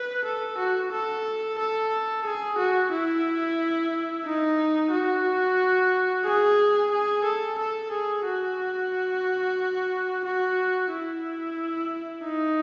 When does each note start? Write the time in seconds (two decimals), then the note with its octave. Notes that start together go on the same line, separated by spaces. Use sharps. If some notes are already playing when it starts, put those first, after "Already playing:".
Already playing: B4
0.25 A4
0.58 F#4
0.92 A4
1.58 A4
2.25 G#4
2.58 F#4
2.92 E4
4.25 D#4
4.92 F#4
6.25 G#4
6.91 G#4
7.24 A4
7.58 A4
7.91 G#4
8.25 F#4
10.24 F#4
10.91 E4
12.24 D#4